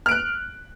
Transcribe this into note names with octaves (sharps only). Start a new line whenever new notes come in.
F6 F#6 D7